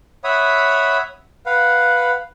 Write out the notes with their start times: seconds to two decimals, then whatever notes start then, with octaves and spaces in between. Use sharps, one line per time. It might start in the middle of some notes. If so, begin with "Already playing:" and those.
0.24 C#5 E5 F#5 B5 D#6
1.46 B4 F5 F#5